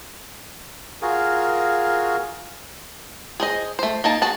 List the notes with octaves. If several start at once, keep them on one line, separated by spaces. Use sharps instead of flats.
F4 F#4 G#4 A#4
G#4 C5 D#5
A3 C5
A#3 D#4 A5
F#4 G#4 A5